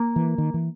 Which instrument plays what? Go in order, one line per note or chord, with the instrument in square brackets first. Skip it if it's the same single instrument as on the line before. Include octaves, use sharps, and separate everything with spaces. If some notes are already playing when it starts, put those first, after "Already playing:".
Already playing: [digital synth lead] A#3
[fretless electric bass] E3
D#3
E3